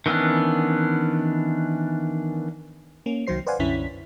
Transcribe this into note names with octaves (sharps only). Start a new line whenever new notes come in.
D#3 E3 B3 C#4 D4
A#3 C#4
C2 D#3 F#3 C5 C7
B4 C5 D5 F5 F#5 G#5
C2 F#2 D3 C#4 E4 B6